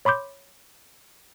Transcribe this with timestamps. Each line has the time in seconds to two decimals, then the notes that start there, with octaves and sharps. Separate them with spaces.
0.05 C#5 B5 C6 D6 G6